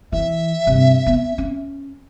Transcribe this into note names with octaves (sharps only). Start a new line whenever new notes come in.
E3 E5
G2 C3
B3
C#4